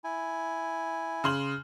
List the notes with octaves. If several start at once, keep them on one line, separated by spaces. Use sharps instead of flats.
E4 G#5
C#3 C6 F#7